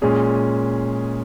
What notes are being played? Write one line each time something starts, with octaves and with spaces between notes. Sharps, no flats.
A#2 G#3 C#4 G#4